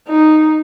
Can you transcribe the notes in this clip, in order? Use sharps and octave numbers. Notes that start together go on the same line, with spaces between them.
D#4